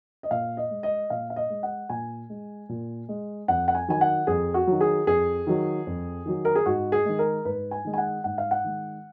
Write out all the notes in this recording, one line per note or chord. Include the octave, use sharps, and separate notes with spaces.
D#5
A#2 F5
D#5
G#3
D#5
A#2 F5
F5
D#5
G#3
F#5
A#2 G#5
G#3
A#2
G#3
F2 F#5
F#5
G#5
D#3 F#3 G#5
F#5
F2 G#4
F#4
D#3 F#3
G#4
F2 G#4
D#3 F#3
F2
D#3 F#3
A#4
G#4
G#2 F#4
G#4
D#3 G#3
A#4
G#2 B4
G#5
D#3 G#3
G#5
F#5
G#2 F#5
F5
F#5
D#3 G#3